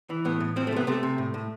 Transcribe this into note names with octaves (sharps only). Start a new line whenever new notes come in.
E3
A2 B3
A2
F3 C4
A3
C3 B3
C3 A3
C3
A2
A2